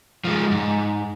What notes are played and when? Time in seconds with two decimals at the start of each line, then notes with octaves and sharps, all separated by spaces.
0.24 F3 G#3
0.51 G#2